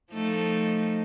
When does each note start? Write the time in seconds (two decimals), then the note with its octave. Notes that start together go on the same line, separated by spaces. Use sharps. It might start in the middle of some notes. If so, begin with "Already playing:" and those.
0.13 F3 A3 D#4